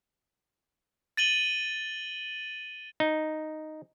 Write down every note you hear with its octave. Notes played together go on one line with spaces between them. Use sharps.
A6 D#7 F#7 G7
D#4